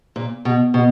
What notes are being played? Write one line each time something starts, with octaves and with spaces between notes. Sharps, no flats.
A#2
B2
B2